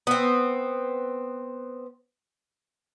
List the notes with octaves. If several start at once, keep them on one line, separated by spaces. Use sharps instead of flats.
B3 C4